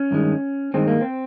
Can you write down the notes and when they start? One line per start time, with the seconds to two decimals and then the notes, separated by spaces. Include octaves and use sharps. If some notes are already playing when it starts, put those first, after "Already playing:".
Already playing: C#4
0.11 G2 D#3 G#3
0.74 G2 D#3 G#3 C4
0.87 A#3
1.01 C4